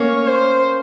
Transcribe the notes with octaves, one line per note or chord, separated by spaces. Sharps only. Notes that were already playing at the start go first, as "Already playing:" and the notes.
Already playing: A#3 C#4 C#5
C5